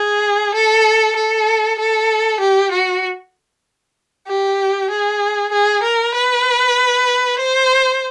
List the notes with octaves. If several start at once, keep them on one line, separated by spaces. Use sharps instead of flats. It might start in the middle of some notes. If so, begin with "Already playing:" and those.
Already playing: G#4
A4
A4
A4
G4
F#4
G4
G#4
G#4
A#4
B4
C5